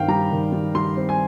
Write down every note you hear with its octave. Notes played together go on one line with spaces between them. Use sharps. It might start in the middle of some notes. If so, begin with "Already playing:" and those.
Already playing: G2 D#3 C4 F5 G5
G3 A#5
D#3
G3
G3 C6
C4
G#5